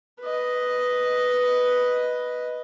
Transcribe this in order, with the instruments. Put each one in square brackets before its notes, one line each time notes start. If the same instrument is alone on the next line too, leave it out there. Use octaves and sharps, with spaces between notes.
[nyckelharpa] B4 D#5